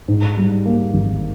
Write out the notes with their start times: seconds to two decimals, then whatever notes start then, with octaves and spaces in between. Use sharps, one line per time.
0.08 G#2
0.37 G3
0.65 A#3
0.94 G#1